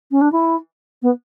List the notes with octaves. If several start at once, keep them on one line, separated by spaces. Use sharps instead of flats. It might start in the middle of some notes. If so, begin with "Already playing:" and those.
C#4
D4
E4
B3